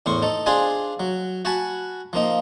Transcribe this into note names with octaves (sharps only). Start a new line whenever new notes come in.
E2 A2 C5 C#6
D#4 A4
D4 F4 G#4 C5 D5 G#5
F#3
F#4 F#5 G#5 A5 B5
F3 A#3 D#4